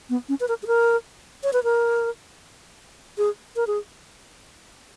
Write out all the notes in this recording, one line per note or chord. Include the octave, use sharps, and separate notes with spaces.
B3
C#4
B4
A#4
G#4
A#4
C#5
B4
A#4
G#4
A#4
G#4